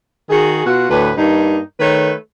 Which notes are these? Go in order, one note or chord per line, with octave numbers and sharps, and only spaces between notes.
D#3 F#4 G#4
B2 F4 F#4
D2 A2 B4
G2 A#3 D#4
D#3 A3 B4 C#5